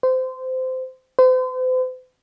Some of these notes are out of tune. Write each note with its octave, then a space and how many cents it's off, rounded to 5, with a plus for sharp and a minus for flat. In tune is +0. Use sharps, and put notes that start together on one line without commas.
C5 -20
C5 -40